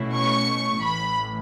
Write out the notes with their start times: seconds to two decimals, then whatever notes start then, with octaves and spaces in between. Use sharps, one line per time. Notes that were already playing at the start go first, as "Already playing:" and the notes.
Already playing: B2 A3 C#4 E4
0.15 C#6
0.83 A1 A2 E3 B5